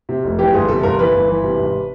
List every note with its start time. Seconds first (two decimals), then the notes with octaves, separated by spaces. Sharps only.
0.09 C3
0.24 F1
0.39 E3 G4
0.53 G1 G#4
0.68 C3 A4
0.83 G1 A#4
0.98 E3 B4
1.14 G1
1.28 E3
1.44 C3
1.59 G#1